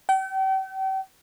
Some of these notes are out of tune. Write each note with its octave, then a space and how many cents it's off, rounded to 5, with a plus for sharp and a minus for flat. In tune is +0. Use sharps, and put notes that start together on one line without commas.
G5 -40